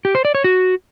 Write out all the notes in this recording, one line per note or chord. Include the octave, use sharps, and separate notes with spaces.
G4
C5
D5
C#5
F#4